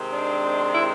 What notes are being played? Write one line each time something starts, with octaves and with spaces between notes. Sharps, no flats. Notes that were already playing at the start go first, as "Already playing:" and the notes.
Already playing: C3 D#3 G#3 C4
D4
E4